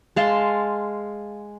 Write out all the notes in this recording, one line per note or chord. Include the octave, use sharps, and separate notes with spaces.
G#3 F5 A5 C6